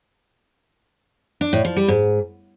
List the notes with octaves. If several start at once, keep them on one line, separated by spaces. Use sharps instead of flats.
D4
A2
F3
G3
G#2